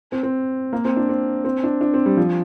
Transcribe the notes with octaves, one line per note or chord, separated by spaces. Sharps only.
C4
C4
A#3
C4
D4
C4
C4
D4
D4
C4
G3
F3